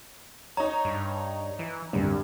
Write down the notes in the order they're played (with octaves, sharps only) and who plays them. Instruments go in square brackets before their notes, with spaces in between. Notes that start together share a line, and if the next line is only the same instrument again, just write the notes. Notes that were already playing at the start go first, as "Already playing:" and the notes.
[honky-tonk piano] D#4 C#5 [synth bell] A#5
[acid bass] G2
E3
[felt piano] C2 D3 [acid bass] F#2